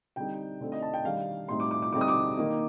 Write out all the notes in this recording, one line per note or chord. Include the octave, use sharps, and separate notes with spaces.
D3 G3 C4 D#4 G5
D3 A3 C4 D#4
D#5
A5
G5
D#3 G3 D4 F5
A2 G3 C4 D#4 C6
D6
D6
D6
D3 G3 C4 D#4 D6
D#6
D6
D#3 A#3 D#4